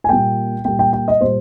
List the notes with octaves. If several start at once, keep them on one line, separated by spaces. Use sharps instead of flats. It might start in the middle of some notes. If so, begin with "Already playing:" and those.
G#5
A#2 G3 A#3 G5
A#2 G3 A#3 G5
G5
G5
D#5
A#2 G3 C5